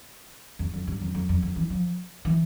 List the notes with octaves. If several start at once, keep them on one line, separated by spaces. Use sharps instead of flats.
E2
F2
G2
F2
F2
F2
F2
E3
F3
E3